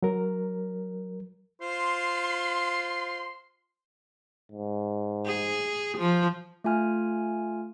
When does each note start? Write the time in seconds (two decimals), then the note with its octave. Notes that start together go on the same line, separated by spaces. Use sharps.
0.03 F#3 A#4
1.61 F4 C5 C6
4.52 G#2
5.26 G#4
5.98 F3
6.64 A3 F4 G#5 F6